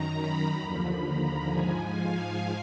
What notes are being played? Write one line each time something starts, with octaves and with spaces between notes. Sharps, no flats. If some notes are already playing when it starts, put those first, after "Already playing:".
Already playing: F#2 D#3 A#5
B5
D#2 D3 F3 B5
A#5
G#2 F3 G#5
F5